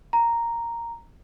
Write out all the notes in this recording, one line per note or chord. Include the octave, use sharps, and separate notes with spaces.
A#5